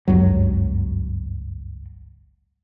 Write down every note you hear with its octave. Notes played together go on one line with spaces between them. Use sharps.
G1 C#2 F#2 F#3